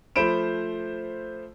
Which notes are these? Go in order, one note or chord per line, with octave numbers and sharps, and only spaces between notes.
F3 A3 C5 B5 D7 E7